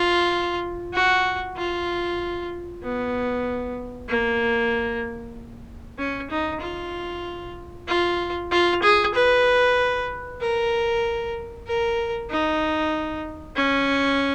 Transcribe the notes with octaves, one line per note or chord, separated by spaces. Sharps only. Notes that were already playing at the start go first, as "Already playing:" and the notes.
Already playing: F4
F#4
F4
B3
A#3
C#4
D#4
F4
F4
F4
G#4
B4
A#4
A#4
D#4
C#4